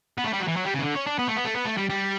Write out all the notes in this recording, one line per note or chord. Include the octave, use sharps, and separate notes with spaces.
B3
A3
G3
F#3
E3
F#3
G3
C#3
E3
D3
C#4
D4
B3
A3
B3
A3
B3
A3
G3
G3